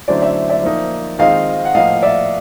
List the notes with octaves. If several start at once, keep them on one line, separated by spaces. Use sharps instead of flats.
D3 F#3 A3 C#4 E4 C5 D5
D5 E5
D5 E5
F3 A#3 D#4
D#3 G#3 C4 F4 D#5 F5
F#5
A2 F3 A#3 D#5 F5
D5 E5